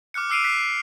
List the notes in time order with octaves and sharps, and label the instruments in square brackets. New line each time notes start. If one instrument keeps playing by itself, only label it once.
[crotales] D6 F6 F#6 C#7
D6 E6 C7 D7 D#7 F7
F#6 B6 C7